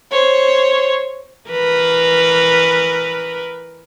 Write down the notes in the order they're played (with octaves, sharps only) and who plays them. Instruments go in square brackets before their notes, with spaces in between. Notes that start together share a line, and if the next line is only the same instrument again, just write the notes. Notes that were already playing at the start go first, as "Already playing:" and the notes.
[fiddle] C5 C#5
[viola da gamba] E3 A#4 B4